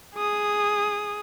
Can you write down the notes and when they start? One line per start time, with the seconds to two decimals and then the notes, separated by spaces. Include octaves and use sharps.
0.15 G#4 D#6